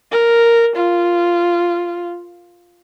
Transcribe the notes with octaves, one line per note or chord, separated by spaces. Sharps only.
A#4
F4